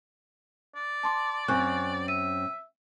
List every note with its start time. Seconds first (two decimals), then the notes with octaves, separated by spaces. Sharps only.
0.75 D5
1.03 A5 C6 D6
1.48 F#2 C4 G#5 C#6 F#6
2.08 E5 D#7